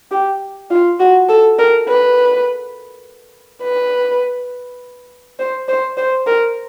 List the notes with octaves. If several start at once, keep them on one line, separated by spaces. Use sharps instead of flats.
G4
F4
F#4
A4
A#4
B4
B4
C5
C5
C5
A#4